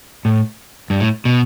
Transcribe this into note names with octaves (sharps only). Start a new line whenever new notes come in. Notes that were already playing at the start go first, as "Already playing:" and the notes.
A2
G2
A2
B2